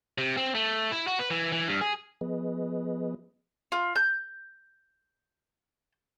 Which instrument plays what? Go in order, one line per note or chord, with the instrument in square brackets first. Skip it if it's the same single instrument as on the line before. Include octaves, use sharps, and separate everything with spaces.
[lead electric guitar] C3
C4
A3
E4
F#4
B4
E3
E3
G2
G#4
[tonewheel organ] F3 B3 G#4 B4 D#5
[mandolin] F4
G6